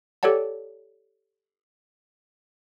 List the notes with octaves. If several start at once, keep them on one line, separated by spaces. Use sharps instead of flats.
G4 A4 C#5 D5 F#5 A5